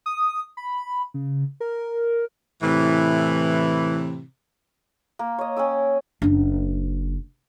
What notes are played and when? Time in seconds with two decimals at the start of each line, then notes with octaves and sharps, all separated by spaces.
0.06 D#6
0.57 B5
1.14 C#3
1.60 A#4
2.63 A2 C3 E3
5.19 A#3
5.38 C#5 D#5
5.57 C#4 G5 D#6 E6
6.22 F#1 D4